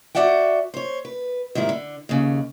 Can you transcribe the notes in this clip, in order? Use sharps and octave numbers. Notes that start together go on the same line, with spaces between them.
F#4 G4 D5 E5 F#5 G5
C5 C#5
B4
G#2 D#3 G3 E4
D3
D#2 C#3